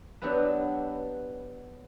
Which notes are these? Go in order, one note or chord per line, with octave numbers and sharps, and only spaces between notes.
F#3 B3 D4 E4 G4 B4